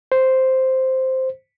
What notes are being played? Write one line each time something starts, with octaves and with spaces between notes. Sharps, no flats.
C5